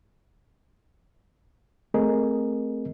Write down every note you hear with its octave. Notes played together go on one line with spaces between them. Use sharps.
A3 C4 G#4 A#4 D#5